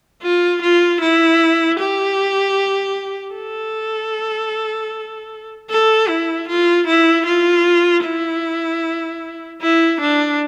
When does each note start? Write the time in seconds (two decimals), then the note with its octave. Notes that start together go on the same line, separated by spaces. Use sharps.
0.22 F4
0.62 F4
1.01 E4
1.79 G4
3.35 A4
5.70 A4
6.09 E4
6.48 F4
6.87 E4
7.26 F4
8.05 E4
9.61 E4
10.01 D4